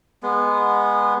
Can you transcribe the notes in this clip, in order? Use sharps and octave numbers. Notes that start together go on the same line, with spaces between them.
G#3 B3